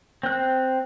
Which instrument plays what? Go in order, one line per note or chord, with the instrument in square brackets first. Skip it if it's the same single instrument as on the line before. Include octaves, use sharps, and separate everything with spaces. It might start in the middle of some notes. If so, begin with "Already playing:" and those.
[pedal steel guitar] C4 F#6